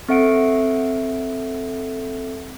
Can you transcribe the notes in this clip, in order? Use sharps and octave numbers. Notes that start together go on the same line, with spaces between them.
C4 A4 E5 F#5 C#7 D7